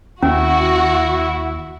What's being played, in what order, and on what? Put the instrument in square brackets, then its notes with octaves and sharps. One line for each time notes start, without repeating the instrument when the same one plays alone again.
[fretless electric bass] D#2 [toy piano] C#4 [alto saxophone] E4 [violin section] F#4